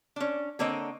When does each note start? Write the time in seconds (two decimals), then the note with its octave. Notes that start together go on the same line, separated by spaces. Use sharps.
0.16 C#4 D4
0.59 D3 A#3 C4 C#5 D#5